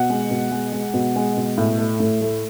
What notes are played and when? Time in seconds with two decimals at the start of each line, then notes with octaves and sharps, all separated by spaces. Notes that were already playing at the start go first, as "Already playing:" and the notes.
Already playing: B2 F#5
0.10 G#3
0.30 B2
0.51 G#3
0.72 G#3
0.94 B2
1.16 G#3
1.37 B2
1.58 A2
1.78 A3
2.00 A2
2.21 A3